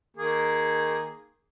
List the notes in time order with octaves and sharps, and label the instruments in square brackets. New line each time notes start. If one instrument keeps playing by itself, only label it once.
[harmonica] D#3 A#3 G#4